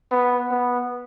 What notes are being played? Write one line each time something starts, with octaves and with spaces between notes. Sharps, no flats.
B3
B3